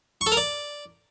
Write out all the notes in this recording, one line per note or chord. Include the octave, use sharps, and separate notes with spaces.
C#6
A4
A#4
D5